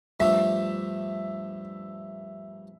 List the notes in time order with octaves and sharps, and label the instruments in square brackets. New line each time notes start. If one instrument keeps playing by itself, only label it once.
[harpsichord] G2 F3 A3 D4 F4 [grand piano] E5